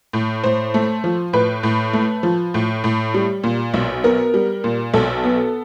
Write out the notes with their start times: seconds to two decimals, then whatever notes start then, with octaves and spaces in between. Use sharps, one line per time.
0.13 A2
0.44 A2 C5
0.74 A3
1.04 F3
1.33 A2 B4
1.63 A2
1.93 A3
2.23 F3
2.54 A2
2.84 A2
3.14 G3
3.44 A#2
3.74 B1
4.04 B3 A#4
4.34 G3
4.64 A#2
4.94 B1 A4
5.24 B3